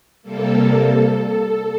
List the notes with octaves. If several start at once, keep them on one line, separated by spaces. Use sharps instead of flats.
C3 G3 A#3 A4